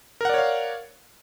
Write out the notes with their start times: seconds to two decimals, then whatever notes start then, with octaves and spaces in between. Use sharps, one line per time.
0.21 A#4
0.25 F#5
0.29 D5
0.34 C#5
0.38 F5